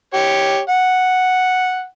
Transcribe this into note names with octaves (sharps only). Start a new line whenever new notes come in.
G4 C#5
F#5